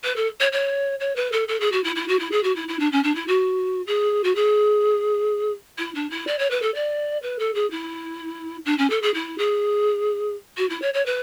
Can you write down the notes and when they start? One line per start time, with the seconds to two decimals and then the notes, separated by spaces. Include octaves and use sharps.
0.04 B4
0.16 A4
0.40 C#5
0.52 C#5
1.00 C#5
1.16 B4
1.32 A4
1.48 A4
1.60 G#4
1.72 F#4
1.84 E4
1.95 E4
2.08 F#4
2.19 E4
2.31 G#4
2.43 F#4
2.56 E4
2.68 E4
2.79 D4
2.92 C#4
3.03 D4
3.15 E4
3.28 F#4
3.87 G#4
4.24 F#4
4.35 G#4
5.78 E4
5.95 D4
6.10 E4
6.27 D5
6.39 C#5
6.50 B4
6.62 A4
6.75 D5
7.22 B4
7.39 A4
7.54 G#4
7.71 E4
8.65 D4
8.78 C#4
8.90 A4
9.02 G#4
9.14 E4
9.38 G#4
10.57 F#4
10.69 E4
10.82 C#5
10.94 C#5
11.06 B4